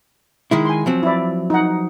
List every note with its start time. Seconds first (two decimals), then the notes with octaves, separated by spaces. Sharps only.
0.51 D#3 G#3 E4
0.65 G#5 C6
0.86 F3 F#3 C4
1.03 E4 D5
1.50 D#4 F#5